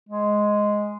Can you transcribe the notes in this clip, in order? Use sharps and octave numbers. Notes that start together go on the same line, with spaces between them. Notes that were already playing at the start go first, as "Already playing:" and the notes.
G#3